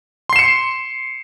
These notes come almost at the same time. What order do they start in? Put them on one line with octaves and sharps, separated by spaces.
C6 C7 E7 C#7